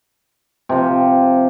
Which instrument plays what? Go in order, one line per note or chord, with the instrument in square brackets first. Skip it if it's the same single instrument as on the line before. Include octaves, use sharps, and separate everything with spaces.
[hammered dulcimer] C3 F3